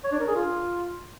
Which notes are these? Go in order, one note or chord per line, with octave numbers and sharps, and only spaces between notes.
C#5
D4
A#4
G#4
F4